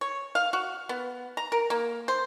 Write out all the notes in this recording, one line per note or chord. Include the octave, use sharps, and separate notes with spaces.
C#5
F5
F#4
B3
A#5
A#4
A#3
C5